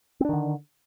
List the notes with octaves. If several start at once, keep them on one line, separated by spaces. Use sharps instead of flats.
D3 D#3 C4 D4